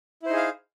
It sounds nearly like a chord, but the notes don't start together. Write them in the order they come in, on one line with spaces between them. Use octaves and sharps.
E4 C5 D#4 G#4 F5